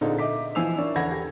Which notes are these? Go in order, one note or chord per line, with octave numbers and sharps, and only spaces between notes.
A#2 D3 C4 D#4 G#4 A4
D#5 E5 D6 B6
E3 F3 G#5 E6 C7 F7
C#4 D4 E4 A#4 D5
E2 A4 F#5 B5 G#6 A#6
G4